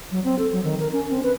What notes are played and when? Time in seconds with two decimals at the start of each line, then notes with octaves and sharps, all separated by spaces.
0.11 F#3
0.24 C4
0.39 A4
0.52 F#3
0.63 D#3
0.80 A#4
0.93 C#4
1.10 C4
1.23 B4